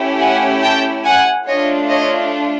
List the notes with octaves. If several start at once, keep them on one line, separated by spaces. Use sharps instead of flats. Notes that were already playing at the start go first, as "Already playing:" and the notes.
Already playing: A3 C#4 E4 G4
F#5 G#5
G5 A5
F#5 G#5
A3 D4 F4 C#5 D#5
C#5 D#5